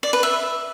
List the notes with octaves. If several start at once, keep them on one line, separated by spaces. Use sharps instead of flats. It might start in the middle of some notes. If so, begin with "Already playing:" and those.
D5
B4
E5